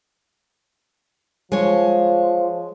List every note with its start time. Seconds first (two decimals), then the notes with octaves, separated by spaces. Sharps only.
1.52 F3 G#3 C#5